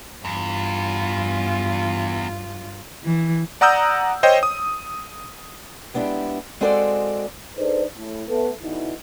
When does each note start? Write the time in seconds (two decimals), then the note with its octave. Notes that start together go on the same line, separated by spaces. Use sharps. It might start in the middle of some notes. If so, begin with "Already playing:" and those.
0.25 E2 G2 F4
3.04 E3
3.61 D5 F#5 A#5 D#6 E6 G6
4.23 C5 C#5 D#5 G5
4.43 D#6
5.94 G#3 B3 D4 E4 G4
6.61 G#3 C4 F#4 G#4 A4 D5
7.57 D4 D#4 G#4 A4 B4 C5
7.96 A2
8.27 A3 B3
8.62 B2 D3 E3 D#4 E4